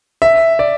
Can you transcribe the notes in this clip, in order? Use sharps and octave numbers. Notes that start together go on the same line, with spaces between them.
E5
D5